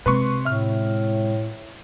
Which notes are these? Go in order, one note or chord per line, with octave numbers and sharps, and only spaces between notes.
C3 G#3 B4 C6 C#6
A2 E5 F6